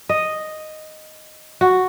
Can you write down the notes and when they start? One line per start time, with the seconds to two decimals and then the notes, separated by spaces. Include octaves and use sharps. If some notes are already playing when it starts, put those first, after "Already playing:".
0.09 D#5
1.61 F#4